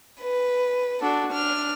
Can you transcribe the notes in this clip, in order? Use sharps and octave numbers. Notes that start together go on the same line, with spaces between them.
B4
D4 F#4 A4
D4 F6